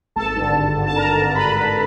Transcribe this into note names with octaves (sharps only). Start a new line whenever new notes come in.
G#1 A4 A5
G2 D3
G#1
G2 D3
A5
G#1 A#4 A#5
G2 D3
G#1 B4 B5
G2 D3